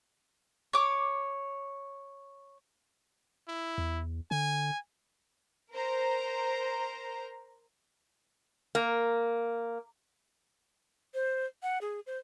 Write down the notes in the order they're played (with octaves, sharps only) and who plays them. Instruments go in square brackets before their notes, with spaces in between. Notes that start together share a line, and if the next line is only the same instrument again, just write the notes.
[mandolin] C#5 D6
[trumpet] E4
[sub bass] E2
[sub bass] D3 [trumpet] G#5
[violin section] A#4 C5 A#5
[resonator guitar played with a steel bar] A#3
[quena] C5
F#5
G#4
C5